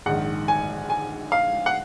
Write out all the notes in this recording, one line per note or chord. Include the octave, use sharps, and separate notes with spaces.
A#1 G#2 D#3 F#5
G#5
G#5
F5
F#5